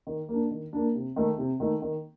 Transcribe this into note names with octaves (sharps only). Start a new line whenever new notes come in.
D#3
A#3 D4
D#3
A#3 D4
C3
D#3 A3 D#4
C3
D#3 A3 D#4
D#3